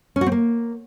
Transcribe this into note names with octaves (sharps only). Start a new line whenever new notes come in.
C#4
F#4
C4
A#3